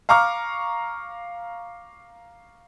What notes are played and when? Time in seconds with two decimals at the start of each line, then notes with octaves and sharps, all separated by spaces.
0.09 F5 A#5 C#6 D6 F6